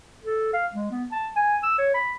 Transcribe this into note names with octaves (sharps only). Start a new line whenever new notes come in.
A4
F5
G#3
B3
A5
G#5
E6
C#5
B5